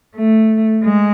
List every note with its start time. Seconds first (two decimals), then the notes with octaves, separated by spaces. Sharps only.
0.16 A3
0.84 G#3